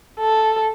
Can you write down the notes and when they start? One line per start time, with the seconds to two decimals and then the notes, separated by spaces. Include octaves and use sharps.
0.20 A4